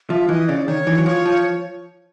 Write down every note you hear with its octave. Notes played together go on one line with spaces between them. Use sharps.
F3 E5
E3 D#5
C#3 D5
D#3 C#5
E3
F#3
F3 C#5
F3